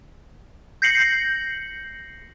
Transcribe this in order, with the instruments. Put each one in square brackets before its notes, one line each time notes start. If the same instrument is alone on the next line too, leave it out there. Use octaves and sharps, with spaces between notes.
[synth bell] G6 A#6 C7 C#7 F#7